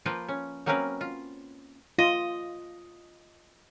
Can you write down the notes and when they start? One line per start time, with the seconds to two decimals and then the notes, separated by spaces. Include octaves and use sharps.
0.06 F3 A#3 F4 B4 G5
0.28 C#4
0.66 F#3 A#3 C4 C#4 A#4 B4
1.01 F4
1.98 F4 D#5